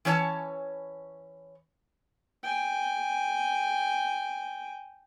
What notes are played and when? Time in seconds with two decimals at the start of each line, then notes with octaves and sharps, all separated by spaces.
0.05 E3 C#4 C#5 D#5 A5
2.43 G5 G#5